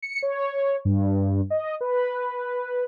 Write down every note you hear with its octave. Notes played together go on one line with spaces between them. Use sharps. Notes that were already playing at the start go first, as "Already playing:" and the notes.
C#7
C#5
G2
D#5
B4